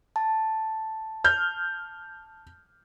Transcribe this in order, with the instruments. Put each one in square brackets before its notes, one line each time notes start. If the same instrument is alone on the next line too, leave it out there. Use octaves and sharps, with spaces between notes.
[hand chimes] A5
[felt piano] F6 G6